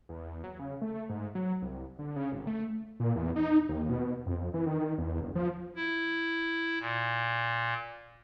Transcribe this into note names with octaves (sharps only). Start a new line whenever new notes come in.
E2
F#3
C#3
A3
G#2
F#3
C2
D3
C#3
G#1
A3
A#2
E2
D#4
D#2
B2
F2
E3
D#3
E2
F#1
F3
E4
A#2